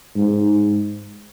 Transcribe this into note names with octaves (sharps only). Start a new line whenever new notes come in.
G#2